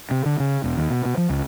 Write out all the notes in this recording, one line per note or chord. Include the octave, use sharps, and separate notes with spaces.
C3
D3
C#3
E1
D#2
B2
B2
F3
C#2